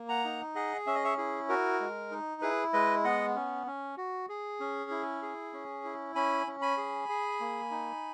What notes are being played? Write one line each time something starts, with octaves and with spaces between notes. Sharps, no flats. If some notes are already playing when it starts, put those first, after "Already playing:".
Already playing: A#3
F#5 A#5
D#4
G#4 D#5 F#5
C#4 E5
D#5
C#5 E5
E4 G#4
F#4 A#4
G#3
D#4
E4 G#4 B4
G#3 B4 D#5
B3 D#5 F#5
C#4
C#4
F#4
G#4
C#4
E4
G#4
C#4
E4
C#4 G#5 B5
C#4
G#5 B5
G#4
G#4
A#3
D#4